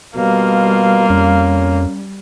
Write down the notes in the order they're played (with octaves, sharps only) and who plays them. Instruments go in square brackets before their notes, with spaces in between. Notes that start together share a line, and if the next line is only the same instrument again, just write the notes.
[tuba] B2 [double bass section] G3 [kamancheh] A#3 F4
[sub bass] F2 [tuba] C#4